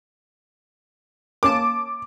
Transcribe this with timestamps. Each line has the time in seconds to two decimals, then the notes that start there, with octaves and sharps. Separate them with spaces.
1.43 A#3 C#4 A5 D6